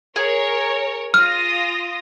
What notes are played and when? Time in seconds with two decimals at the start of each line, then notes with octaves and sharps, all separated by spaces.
0.16 G#4 A#4 C#5
1.14 F4 D#6 F6 A#6